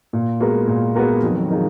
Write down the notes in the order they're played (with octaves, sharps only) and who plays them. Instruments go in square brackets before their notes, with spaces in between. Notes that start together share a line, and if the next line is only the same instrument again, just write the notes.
[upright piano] A#2
G#3 B3 F#4 A#4
A#2
G#3 B3 F#4 A#4
[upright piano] F2 [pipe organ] D#3 F#3
[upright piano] F3 G#3 D#4 A#4